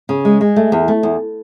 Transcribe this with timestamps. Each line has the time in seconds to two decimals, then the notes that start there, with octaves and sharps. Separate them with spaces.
0.09 C#3
0.25 G#3
0.41 G#3
0.56 A3
0.72 E2
0.88 A3
1.03 E2